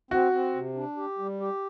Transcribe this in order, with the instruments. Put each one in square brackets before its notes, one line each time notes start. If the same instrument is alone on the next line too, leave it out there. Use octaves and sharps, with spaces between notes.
[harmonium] C4 [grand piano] F#4
[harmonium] C4
C3
D4
G4
G3
G4